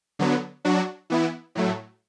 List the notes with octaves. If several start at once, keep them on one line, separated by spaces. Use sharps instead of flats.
D3 F#3 B3
F#3 D4 F#4
E3 B3 E4
A2 F#3 A3